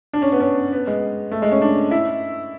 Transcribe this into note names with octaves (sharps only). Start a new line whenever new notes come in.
D4
C#4
B3
C#4
B3
G#3
A3
G#3
C#4
D4
E4